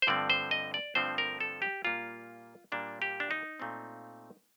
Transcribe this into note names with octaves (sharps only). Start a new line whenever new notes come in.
C5
G2 D3 F3 A3 C4 D5
C5
D#5
D5
G2 D3 F3 A3 C4 C5
A#4
A4
G4
A#2 G3 A#3 F4
A#2 G3 A#3 D4
G4
D4
D#4
A#2 A3 C4